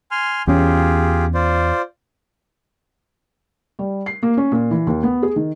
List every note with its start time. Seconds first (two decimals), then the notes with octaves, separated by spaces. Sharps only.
0.11 G#5 C6 F6
0.47 E2 C#4 F4 G4 G#4
1.34 F4 C5 D5
3.79 G3
4.06 C7
4.23 A#3
4.37 C#4
4.52 A#2
4.71 E3
4.87 D#2
5.03 B3
5.23 G#4
5.36 D#3